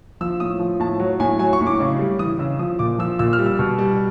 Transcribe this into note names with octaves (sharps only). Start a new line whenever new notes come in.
F3 E6
A2 D#6
F3
A2 A5
F#3
A2 G#5
F#3 G#5
C#6
A2
D6
C#3
G3
E3 D#6
C#3 E6
F3 D#6
A#2 D6
F3 E6
A#2 E6
F6
G3
E6
B2
G3